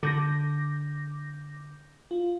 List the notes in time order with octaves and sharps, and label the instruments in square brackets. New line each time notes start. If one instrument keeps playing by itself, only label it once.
[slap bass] D3 [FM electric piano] D6 G6 A#6
[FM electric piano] F4